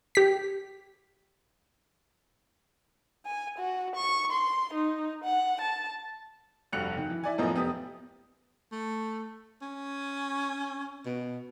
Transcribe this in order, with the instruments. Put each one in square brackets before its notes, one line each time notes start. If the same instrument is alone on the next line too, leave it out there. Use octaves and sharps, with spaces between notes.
[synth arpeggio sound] G4 B6
[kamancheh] G#5
F#4
C#6
C6
D#4
F#5
A5
[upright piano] F1 G2 F#4 F#6 C#7 F7
D#3
E3
E4 D5 G#5
F#2 A2 F3 B3 A#4 D#5
F1 B3 G4 D#6
[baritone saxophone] A3
C#4
B2